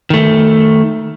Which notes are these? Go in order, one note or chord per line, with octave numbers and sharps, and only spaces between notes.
D#3 A3